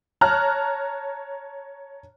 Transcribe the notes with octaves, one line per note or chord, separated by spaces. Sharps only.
C#5 A5 A#5 F6 F#6